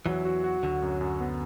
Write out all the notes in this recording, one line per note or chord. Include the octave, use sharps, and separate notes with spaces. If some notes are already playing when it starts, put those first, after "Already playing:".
E2 E3 F#3
F#4
F#4
D2 D3 F#4
F#2
F#2
B3